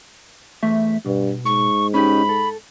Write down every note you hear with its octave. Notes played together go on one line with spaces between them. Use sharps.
E2 A3 E5
G2 B2
G#2 C#6
C#4 D#4 G4 B5
A4